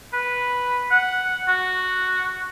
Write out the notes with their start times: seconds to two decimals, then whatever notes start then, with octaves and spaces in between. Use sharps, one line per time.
0.14 B4
0.91 F#5
1.48 F#4